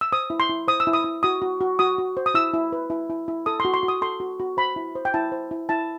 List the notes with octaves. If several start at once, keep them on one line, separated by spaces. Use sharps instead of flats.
E6
C5 D#6
E4
C6
E4
C5 D#6
E6
E4
D#6
E4
F#4 D#6
F#4
F#4
F#4 D#6
F#4
C5
D#6
E4 E6
E4
B4
E4
E4
E4
A4 D#6
C6
F#4
C6
F#4
D#6
A4 C6
F#4
F#4
C5 B5
E4
C5
G5
E4 A5
C5
E4
E4 A5